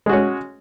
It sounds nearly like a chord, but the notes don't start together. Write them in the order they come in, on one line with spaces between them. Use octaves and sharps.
G#3 F#4 C#4